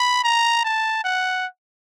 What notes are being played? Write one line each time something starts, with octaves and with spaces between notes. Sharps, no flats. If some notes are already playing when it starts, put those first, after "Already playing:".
Already playing: B5
A#5
A5
F#5